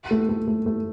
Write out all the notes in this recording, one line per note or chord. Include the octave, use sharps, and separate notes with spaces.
A3
A3
A3
A3